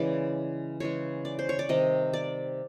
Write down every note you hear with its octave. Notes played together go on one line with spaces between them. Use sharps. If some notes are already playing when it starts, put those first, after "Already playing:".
Already playing: C#3 E3 G#3 D5
C#3 E3 G#3 C#5
D5
C5
C#5
D5
C3 D#3 G3 D#5
D5